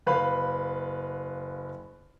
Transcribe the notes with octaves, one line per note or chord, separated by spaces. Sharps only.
F#1 B4 F5 B5